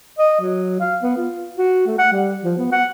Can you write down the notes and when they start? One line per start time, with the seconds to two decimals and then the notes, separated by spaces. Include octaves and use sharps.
0.18 D#5
0.41 F#3
0.80 F5
1.02 B3
1.17 F4
1.57 F#4
1.87 A3
1.99 F#5
2.12 G3
2.43 F3
2.58 B3
2.72 F#5